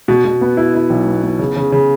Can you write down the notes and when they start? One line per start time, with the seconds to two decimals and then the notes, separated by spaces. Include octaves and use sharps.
0.08 B2
0.25 B2
0.41 B3
0.57 E4
0.74 E4
0.90 B1
1.06 B3
1.23 B3
1.39 C#3
1.56 C#3
1.72 C#3